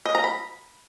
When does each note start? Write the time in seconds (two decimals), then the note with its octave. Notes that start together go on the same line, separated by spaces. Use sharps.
0.05 D#5
0.15 A#5
0.24 B5